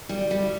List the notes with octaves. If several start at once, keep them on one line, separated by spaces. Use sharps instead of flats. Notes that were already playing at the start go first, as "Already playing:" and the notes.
G3
G3